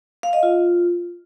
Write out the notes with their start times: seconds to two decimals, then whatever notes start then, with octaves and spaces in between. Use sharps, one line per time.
0.23 F5
0.33 D#5
0.43 F4